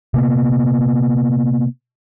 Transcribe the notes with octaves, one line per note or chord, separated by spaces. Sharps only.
C3 A#3 B3